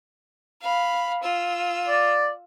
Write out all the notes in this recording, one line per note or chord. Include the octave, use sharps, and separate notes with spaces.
F5 B5
F4 E6
D5